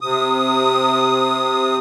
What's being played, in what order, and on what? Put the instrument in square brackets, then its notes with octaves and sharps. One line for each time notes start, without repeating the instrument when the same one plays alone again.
[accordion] C3 D#6